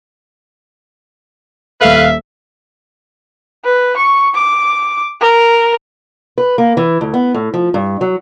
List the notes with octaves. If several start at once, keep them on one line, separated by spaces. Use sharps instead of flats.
D#1 A4 B4 E5 F5
B4
C#6
D6
A#4
B4
A#3
E3
D2
B3
A2
F3
G2
F#3